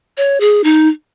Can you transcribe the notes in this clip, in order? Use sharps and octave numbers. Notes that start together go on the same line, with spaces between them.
C#5
G#4
D#4